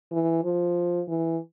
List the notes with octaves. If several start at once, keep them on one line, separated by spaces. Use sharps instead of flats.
E3
F3
E3